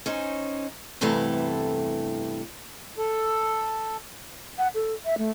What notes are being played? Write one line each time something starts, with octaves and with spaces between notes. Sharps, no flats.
C#4 D#4 C5
E2 G2 C3 E3 A3 A4
A4
F#5
A4
E5
A3